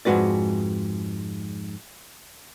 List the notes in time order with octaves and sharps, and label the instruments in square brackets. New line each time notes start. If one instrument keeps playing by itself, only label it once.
[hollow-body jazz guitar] F2 G#2 G#3 F#4 B4 D5